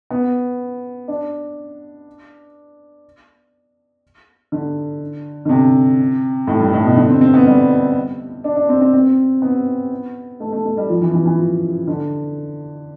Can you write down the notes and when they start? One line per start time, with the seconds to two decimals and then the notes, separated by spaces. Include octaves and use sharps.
0.10 B3
1.08 D4
4.52 D3
5.45 D3
5.49 C3
6.47 A2
6.60 G2
6.73 A2
6.84 B2
6.97 D3
7.09 C4
7.21 C4
7.34 B3
7.46 G3
8.44 D4
8.56 D4
8.69 C4
8.81 C4
8.94 C4
9.42 B3
10.40 A3
10.52 A3
10.65 A3
10.77 G3
10.90 F3
11.01 E3
11.14 E3
11.26 E3
11.38 F3
11.87 D3